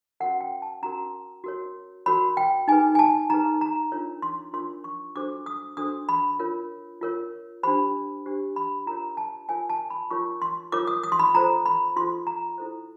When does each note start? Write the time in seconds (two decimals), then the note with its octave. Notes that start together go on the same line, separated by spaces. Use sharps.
0.20 C#4 F#4 A#4 F#5
0.41 G5
0.62 A5
0.83 C#4 F#4 A#4 A#5
1.44 F#4 A#4 C#5
2.06 F#4 A#4 C#5 B5
2.37 G5
2.68 D#4 G#4 B4 G#5
2.95 G#5
2.99 A5
3.30 D#4 G#4 B4 A#5
3.61 A#5
3.92 D4 F4 A#4 C#5
4.22 C6
4.53 D4 F4 A#4 C#5 C6
4.84 C#6
5.16 D4 F#4 A4 C5 D6
5.46 D#6
5.77 D4 F#4 A4 C5 D#6
6.09 B5
6.39 F4 A#4 C#5
7.01 F4 A#4 C#5
7.63 D4 G4 C5 B5
8.26 D4 G4 C5
8.56 B5
8.86 F4 A#4 C#5 A#5
9.17 A5
9.49 F4 A#4 C#5 G#5
9.70 A5
9.90 B5
10.11 F4 A#4 C#5 C#6
10.42 C6
10.72 F4 A#4 C#5 D6
10.87 D#6
11.03 D#6
11.12 C6
11.19 B5
11.34 F4 A4 C5 A#5
11.66 B5
11.96 F4 A4 C5 C6
12.27 A#5
12.58 E4 A4 C5